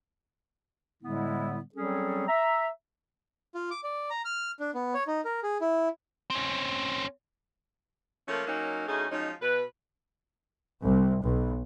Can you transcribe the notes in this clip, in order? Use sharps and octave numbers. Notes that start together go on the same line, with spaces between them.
A2 D3 G3 G#3 B3 E4
F#3 G3 C4 C#4 G#4 A4
E5 A#5
F4
D6
D5
A#5
F6
D4
B3
C#5
D#4
A#4
G#4
E4
C4 C#4
F3 A3 A#3 C#4
F#3 A#3 C#4 D#4
D2 A3 C#4 D#4 G#4
F3 F#3 G#3 C#4 D#4
B2 B4
C2
B1